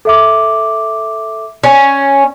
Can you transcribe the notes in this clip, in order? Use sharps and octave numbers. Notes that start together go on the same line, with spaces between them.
A4 E5 D6
C#4